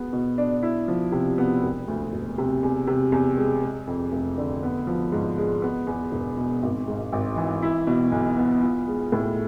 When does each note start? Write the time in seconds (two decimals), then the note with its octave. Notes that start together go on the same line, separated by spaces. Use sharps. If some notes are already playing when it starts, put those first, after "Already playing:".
Already playing: B3 G#4
0.13 B2
0.38 D4
0.63 E4
0.88 F3
1.12 C3
1.38 B3
1.63 E1
1.88 D2
2.13 E1
2.38 C3
2.63 E2
2.87 C3
3.12 E2
3.37 G#3
3.62 G#3
3.87 F2
4.12 F1
4.38 D3
4.63 B3
4.87 F3
5.12 G#2
5.38 G#3
5.62 B3
5.87 E2
6.12 E1
6.37 B2
6.62 G#1
6.88 G#2
7.12 G#1
7.37 E3
7.63 E4
7.87 B2
8.12 B1
8.37 B3
8.63 F4
8.87 G#3
9.12 A2